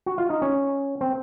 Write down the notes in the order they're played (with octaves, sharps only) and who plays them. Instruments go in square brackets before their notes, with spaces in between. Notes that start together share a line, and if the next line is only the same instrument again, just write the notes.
[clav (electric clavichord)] F#4
F4
D#4
C#4
C4